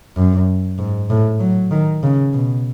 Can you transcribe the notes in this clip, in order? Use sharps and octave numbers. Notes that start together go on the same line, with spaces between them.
F#2
G#2
A2
F#3
D#3
C#3
B2